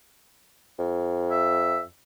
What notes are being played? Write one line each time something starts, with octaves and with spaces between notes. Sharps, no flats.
F2
E5